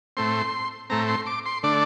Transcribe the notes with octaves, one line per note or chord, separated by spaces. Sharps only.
A2 A3 C4 C6
A2 A3 C4 A#5
C6
D6
C6
D3 A3 D4 D5